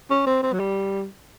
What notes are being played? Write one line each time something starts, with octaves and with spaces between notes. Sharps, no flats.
C#4
C4
C4
F#3
G3